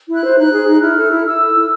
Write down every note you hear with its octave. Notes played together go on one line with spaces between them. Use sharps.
E4
F#6
C5
D#4 F#6
G#4
D#4
E4 F6
A4
E4
E4 E6
A4
E4